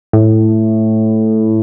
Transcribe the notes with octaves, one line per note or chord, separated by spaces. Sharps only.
A2